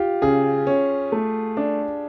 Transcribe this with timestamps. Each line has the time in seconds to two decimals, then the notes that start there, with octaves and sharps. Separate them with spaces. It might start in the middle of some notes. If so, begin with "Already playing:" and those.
Already playing: F4 G4
0.22 C#3 G#4
0.67 C#4
1.12 A3
1.57 D4